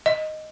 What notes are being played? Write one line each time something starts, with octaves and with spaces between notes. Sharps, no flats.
D#5